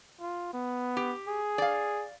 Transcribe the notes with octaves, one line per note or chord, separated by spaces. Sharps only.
F4
B3
G4
G#4
D5 F5